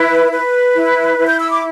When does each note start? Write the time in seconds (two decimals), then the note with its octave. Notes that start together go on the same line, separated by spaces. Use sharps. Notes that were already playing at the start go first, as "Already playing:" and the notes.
Already playing: E4 B4
0.32 B4
0.76 E4
1.18 E4
1.27 G6
1.39 E6
1.51 D6